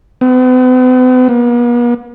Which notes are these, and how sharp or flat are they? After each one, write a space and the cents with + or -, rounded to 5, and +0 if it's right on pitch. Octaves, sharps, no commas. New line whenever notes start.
B3 +45
B3 -45